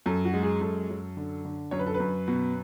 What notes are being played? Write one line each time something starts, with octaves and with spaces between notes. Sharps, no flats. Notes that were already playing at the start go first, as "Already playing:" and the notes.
F#2 A4
F#4
G#3
G#4
F#2 A4
F#2
D3
D3
F#2 C#5
B4
A4
B4
F#2
B2